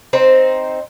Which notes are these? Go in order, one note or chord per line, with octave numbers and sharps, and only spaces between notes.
C4 D#4 C5